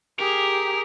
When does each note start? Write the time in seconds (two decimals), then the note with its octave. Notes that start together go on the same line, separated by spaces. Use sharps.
0.19 G4 G#4 A#4